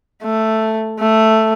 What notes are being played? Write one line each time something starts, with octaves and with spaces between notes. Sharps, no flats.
A3
A3